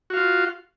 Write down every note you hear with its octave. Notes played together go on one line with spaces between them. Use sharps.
F4 F#4 F5